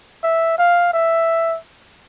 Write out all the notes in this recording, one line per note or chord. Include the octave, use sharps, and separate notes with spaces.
E5
F5
E5